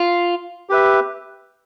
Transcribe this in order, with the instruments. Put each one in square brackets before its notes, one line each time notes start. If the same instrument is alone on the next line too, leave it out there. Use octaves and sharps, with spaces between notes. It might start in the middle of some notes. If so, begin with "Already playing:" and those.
Already playing: [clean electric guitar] F4
[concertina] G4 B4 E5